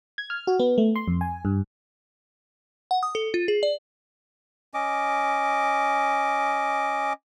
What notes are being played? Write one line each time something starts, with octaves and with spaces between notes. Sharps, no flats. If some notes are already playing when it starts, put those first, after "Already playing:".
G#6
F6
F#4
B3
A3
C6
F2
G#5
G2
F#5
D#6
A4
F4
G#4
D5
C#4 D#5 D6